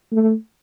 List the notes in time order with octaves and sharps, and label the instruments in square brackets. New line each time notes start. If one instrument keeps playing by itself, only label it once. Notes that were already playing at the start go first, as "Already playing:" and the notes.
[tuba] A3